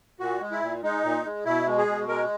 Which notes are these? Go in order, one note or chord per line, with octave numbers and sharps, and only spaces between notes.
A#2 F#4
G#3
E4
A#2
G#3 D#4
A#2
G#3
B2 E4
G#3
G#4
B2
G#3 A#4